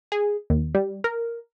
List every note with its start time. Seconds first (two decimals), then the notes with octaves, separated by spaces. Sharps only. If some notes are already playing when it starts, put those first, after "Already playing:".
0.12 G#4
0.50 D#2
0.75 G3
1.04 A#4